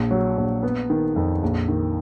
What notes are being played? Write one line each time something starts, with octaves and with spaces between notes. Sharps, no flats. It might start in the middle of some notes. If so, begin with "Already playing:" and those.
Already playing: A#1
F#3
A#1
B3
D#3
F2
A#1
D#3